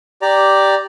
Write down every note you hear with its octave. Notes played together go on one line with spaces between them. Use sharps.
G4 D5 A#5